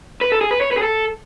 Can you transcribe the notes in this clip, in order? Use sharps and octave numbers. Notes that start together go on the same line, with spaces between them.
B4
A4
G#4
B4
C#5
B4
G#4
A4